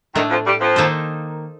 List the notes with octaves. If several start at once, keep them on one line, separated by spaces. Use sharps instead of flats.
A2 D#3 A3 D4
F2 F3
G2 G3
F2 F3
D#3 A#3 D#4 A4 C5